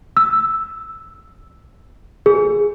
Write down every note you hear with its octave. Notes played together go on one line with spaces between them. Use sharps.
E6
G#4